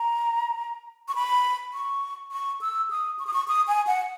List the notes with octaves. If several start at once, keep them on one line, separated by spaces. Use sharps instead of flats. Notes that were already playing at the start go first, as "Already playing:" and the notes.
Already playing: A#5
C#6
B5
C#6
C#6
E6
D#6
C#6
D#6
C#6
D#6
G#5
F#5